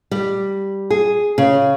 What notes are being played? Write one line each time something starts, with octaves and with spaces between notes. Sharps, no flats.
G3
G#4
C#3